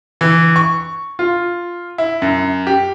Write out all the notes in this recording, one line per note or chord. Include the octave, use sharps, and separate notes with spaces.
E3
C#6
F4
E4
F#2
G4